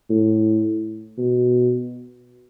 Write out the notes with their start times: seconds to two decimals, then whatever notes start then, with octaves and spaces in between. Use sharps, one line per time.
0.10 A2
1.18 B2